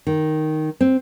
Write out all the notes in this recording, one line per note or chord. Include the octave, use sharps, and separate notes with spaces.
D#3
C4